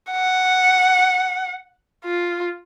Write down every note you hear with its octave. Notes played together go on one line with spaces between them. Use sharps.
F#5
F4